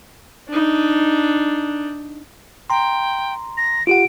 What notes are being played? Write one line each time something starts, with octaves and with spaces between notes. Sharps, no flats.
D4 D#4
G5 A#5 C6
A#6
F4 G4 F#5 D7